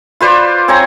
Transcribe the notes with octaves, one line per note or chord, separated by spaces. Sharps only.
F4 B4 C5 D5
C4 C#5 G#5 A#5